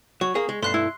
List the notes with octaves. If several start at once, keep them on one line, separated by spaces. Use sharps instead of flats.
F#3 C#6
A#3 G#4
G#3
B1 G2 A3 C6 F#6 C7
E4